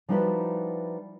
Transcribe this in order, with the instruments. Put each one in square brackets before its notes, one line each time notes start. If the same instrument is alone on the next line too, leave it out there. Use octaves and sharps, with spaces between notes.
[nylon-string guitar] F3 G3 D#4 E4 F#4 B4